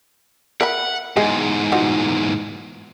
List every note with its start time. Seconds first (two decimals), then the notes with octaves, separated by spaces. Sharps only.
0.61 A#4 E5 F#5 B5
1.17 E2 G#2 G#3 G#4
1.72 F3 D#4 F#4